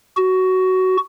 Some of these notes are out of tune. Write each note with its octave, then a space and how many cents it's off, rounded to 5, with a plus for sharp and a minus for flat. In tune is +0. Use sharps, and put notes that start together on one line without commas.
F#4 +15